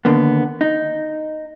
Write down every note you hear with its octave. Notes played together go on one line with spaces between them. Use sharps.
D#2 D3 A#3 B3
D#4